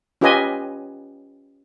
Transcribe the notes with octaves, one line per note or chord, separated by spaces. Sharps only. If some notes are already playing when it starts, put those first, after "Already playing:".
C#4 F4 G4 B4 D#5 G#5